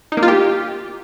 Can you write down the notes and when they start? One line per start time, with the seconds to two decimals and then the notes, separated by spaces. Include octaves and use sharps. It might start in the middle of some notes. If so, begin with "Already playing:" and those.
0.12 D#4
0.17 A#3
0.23 F4
0.28 G4